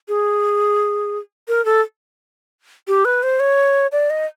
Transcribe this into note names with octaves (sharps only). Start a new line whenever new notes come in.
G#4
A#4
A4
G4
B4
C5
C#5
D5
D#5